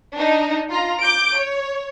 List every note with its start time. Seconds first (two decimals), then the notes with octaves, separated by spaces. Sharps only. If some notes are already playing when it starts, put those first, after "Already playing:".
0.17 D4 D#4
0.70 F4 A#5
1.01 D6 G6 D7
1.36 C#5